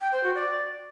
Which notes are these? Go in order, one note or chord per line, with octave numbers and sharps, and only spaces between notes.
G5
C5
F#4
D5